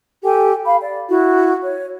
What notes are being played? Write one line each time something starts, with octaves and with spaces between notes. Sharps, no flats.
G4 A4 G5 G#5
F5 B5
D5
E4 F#4
C#5